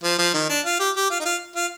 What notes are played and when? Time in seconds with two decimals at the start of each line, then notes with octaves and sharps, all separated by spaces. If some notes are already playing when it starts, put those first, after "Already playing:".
0.04 F3
0.19 F3
0.34 D#3
0.49 D4
0.65 F4
0.79 G4
0.96 G4
1.10 F4
1.20 D#4
1.25 F4
1.56 F4